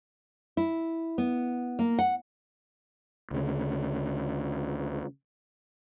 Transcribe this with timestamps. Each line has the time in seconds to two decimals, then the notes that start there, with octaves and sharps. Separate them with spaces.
0.57 E4
1.18 B3
1.79 A#3
1.99 F#5
3.31 D2 C#3